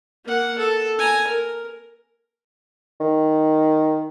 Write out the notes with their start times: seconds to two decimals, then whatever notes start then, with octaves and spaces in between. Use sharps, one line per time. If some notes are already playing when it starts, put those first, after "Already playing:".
0.25 A#3 F#5
0.59 A4
0.99 G#5 A#5
1.28 A#4
3.00 D#3